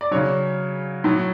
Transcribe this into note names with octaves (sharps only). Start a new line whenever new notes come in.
D5
C#3 F#3 C#5
A2 F#3